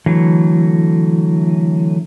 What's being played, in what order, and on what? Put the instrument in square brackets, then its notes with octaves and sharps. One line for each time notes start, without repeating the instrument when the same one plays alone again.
[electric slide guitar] D3 E3 F#3 A3